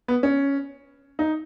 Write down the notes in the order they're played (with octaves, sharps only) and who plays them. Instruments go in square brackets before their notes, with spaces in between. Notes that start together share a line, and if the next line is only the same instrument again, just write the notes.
[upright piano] B3
C#4
D#4